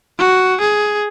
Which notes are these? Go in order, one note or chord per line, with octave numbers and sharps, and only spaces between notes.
F#4
G#4